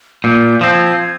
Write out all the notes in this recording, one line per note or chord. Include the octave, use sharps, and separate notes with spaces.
A#2 G6
F3 C4 G6
G#6
G6
G#6